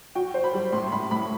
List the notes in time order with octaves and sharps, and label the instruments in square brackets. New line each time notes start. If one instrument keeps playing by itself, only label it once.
[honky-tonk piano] F#4 [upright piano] G5
[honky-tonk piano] C5
[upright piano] B5
[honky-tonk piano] G3
[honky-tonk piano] A2 [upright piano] C6
[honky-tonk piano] A2 [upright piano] B5
[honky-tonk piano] A2 [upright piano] B5